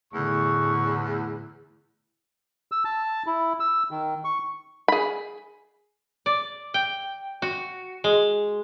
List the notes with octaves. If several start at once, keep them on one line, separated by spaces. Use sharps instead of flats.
E2 A2 D3 A3 E4 C#6
E6
A5
E4
E6
D#3
C#6
G#4 B5
D5
G5
F#4
G#3